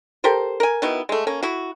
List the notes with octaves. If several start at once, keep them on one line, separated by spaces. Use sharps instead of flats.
G4 A4 A#4 C5
A#4 G#5
B2 D#3 B3 E4
G#3 A3
A#3 C#4
E4 F#4